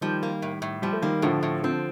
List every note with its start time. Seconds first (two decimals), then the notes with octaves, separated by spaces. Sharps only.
0.01 D#3 F3 G3
0.23 A#3
0.42 A2
0.62 A2
0.82 F3 G3
0.93 A3
1.02 D#3 G3 A#3
1.22 A2 D3 F3
1.43 A2
1.63 D3 F3 C4